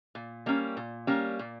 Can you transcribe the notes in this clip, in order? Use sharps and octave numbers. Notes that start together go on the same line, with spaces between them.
A#2
G3 A#3 C#4
A#2
G3 A#3 C#4
A#2